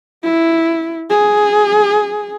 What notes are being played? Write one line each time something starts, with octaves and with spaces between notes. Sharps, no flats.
E4
G#4